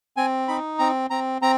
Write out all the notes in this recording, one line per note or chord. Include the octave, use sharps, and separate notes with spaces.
C4 G#5
D#4 B5
C4 A#5
C4 A#5
C4 A#5